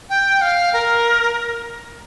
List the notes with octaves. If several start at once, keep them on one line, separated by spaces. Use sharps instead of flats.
G5
F5
A#4